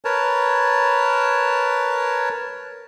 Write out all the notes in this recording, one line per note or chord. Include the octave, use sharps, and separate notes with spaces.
A#4 B4 C#5 A5